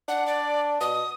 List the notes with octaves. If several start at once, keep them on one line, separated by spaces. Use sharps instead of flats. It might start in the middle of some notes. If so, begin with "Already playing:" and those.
D4 F#5
D5
B2 D#6